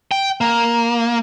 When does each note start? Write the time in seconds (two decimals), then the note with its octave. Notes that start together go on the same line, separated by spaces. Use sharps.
0.11 G5
0.41 A#3